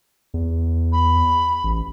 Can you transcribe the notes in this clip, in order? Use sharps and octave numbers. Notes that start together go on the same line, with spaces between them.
E2
B5
A1